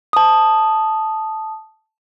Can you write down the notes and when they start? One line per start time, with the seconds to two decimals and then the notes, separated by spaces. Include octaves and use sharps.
0.13 A5 D#6